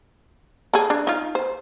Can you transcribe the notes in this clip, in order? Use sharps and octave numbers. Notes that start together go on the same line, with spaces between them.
G#4 A4
D4
D#4 F4
C5